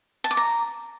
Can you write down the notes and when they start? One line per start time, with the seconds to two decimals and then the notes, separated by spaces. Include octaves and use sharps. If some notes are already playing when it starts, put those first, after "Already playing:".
0.24 A5
0.31 D6
0.37 A#5